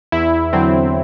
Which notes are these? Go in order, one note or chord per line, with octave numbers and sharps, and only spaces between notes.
E2 E4
D3 F#3 C4